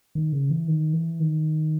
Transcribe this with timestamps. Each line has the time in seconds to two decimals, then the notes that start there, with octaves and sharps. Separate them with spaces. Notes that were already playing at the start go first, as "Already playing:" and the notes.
0.15 D#3
0.33 C#3
0.50 E3
0.68 D#3
0.93 E3
1.20 D#3